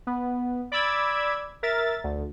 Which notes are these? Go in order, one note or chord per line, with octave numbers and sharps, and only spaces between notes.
B3
D5 B5 D6 E6 G#6
A#4 E5 A6
D2